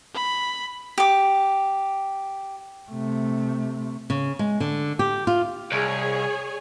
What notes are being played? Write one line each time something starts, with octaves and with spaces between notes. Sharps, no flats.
B5
G4 D6
C3 A3
C#3
G#3
D3
G4
F4
C2 G#4 C#5 G#5